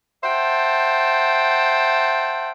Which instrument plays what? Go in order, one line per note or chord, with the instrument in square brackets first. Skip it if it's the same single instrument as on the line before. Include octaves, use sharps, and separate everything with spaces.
[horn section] C5 E5 F#5 G5 A5